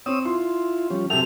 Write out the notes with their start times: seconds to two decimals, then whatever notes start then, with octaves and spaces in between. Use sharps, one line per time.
0.06 C4 C#5 D#6 E6
0.26 E4 F4 C6
0.90 F3 G3 C#4
1.10 F#2 C3 A4 E5 G5 F7